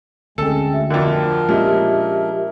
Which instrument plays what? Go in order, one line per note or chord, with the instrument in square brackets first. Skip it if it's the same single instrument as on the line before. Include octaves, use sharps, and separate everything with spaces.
[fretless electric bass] D2 [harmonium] G#3 [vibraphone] C4 C#4 G5 [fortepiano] A4
[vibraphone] F#4 E5
[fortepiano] F2 B2 D3 [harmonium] F3 A#4 [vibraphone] D5 G5
[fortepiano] A#2 [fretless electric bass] G#3 C#4 D4 [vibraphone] G4 D#5 E5